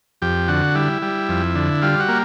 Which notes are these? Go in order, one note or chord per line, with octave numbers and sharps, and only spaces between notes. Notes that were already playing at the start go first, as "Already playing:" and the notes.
F2 G4
D3 F#4
G3 E4
G3
F2
D3
G3 F4
F#4
A#3